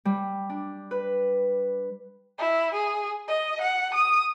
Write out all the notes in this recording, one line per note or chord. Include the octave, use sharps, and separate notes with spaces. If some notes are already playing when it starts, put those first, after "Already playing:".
G3
D4
B4
E4
G#4
D#5
F#5
D#6